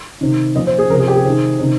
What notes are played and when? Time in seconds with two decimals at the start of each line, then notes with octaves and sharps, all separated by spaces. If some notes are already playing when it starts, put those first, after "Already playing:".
0.21 C3 D#3
0.55 A#2 F3 D#5
0.67 C5
0.79 G#4
0.90 F3 A#4
0.93 C3
0.99 G#4
1.08 G4
1.16 G#4
1.24 C3 D#3
1.59 C3 D#3